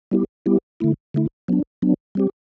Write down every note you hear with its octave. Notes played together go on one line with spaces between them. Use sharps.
G3 B3 E4 G4
G3 B3 E4 G4
D3 A3 E4
D3 A3 E4
F#3 B3 D4
F#3 B3 D4
G3 C4 G4